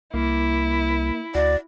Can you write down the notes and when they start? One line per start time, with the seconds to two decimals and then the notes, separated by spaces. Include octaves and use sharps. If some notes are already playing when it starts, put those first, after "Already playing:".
0.14 C2 A#3 E4
1.35 D2 F#4 D5